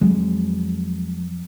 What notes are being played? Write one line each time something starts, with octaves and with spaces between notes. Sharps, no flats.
F2 F#3 G#3